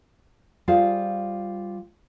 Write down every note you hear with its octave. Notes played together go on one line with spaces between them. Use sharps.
G3 F4 G#4 C5 F5